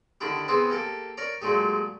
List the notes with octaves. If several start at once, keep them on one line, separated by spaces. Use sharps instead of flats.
D3 D#3 D4 E4 G4
B3 C4 E4 G#4 C5
A#3 G4 A4
A#4 C#5 D5 A#5
A#2 F#3 G#3 A3 D#4 G4